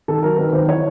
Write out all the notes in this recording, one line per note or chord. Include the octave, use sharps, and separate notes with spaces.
D#3 A4
F#3 A#4
D#3 B4
D#3 C5
E3 C#5